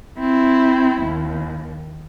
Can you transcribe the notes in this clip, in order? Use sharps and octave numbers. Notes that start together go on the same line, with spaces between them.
C4 E4
D#2